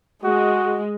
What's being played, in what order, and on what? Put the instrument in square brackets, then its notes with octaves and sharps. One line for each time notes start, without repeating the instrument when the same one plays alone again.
[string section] G#3 [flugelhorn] F#4